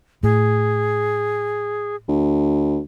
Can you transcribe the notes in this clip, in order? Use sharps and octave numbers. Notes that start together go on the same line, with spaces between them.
A2 G#4
D2